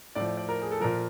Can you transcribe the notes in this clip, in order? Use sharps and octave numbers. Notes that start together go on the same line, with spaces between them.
A2 F3 D5
D5
D5
A#4
G#4
A4
A#2 F3 A#4